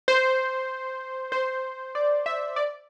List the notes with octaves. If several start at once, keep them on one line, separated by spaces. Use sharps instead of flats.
C5
C5
D5
E5
D5